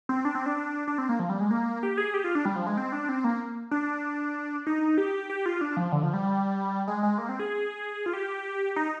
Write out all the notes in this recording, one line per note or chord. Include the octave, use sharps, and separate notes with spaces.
C4
D4
C4
D4
D4
C4
A#3
F3
G3
G#3
A#3
G4
G#4
G4
F4
D4
G3
F3
G#3
C4
D4
C4
A#3
D4
D#4
G4
G4
F4
D4
F3
D3
F3
G3
G#3
G#3
A#3
C4
G#4
F4
G4
D#4